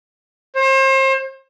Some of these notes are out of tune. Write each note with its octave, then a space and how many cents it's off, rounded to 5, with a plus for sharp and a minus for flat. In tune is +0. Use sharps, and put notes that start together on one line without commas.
C5 +35